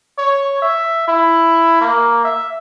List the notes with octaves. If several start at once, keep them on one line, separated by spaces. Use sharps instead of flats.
C#5
E5
E4
A#3
E5